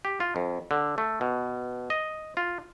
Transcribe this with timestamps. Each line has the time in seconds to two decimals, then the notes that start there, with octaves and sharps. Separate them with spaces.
0.05 G4
0.20 F4
0.36 F2
0.71 D3
0.98 A3
1.21 B2
1.90 D#5
2.37 F4